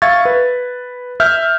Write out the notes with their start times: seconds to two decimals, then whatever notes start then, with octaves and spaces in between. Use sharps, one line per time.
0.02 E5 F5 C#6 G#6 A6
0.25 B4
1.20 E5 F6 G6